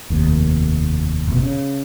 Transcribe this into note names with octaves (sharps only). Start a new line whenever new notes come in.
F1 D#2
F1 B2
C#3